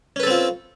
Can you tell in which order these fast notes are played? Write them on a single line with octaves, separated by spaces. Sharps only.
C#4 B4 A4 C4 F4